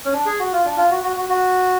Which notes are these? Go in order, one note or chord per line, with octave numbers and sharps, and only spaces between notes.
C#4
D4
G#4
F#4
F4
D4
F4
F#4
F#4
F#4
F#4